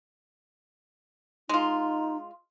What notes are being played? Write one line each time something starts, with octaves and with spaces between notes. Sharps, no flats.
G#3 D#4 F4